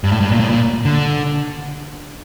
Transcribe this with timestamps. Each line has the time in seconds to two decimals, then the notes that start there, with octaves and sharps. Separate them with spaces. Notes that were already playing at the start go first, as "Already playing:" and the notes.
0.04 G2
0.12 A2
0.20 G2
0.31 A#2
0.40 A2
0.49 A#2
0.85 D3